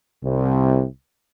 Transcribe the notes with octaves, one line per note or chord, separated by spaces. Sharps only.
C2 C3